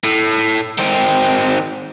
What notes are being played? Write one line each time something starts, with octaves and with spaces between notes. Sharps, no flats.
A2
D#3 C4